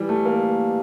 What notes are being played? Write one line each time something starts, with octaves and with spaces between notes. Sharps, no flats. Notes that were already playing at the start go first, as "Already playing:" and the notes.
Already playing: E3 G3
A3
A#3